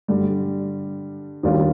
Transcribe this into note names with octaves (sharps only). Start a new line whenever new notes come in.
G2 D3 G3
D#2 D#3 G3 D4 F4